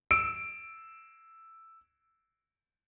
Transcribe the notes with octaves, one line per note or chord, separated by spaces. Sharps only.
E6 D7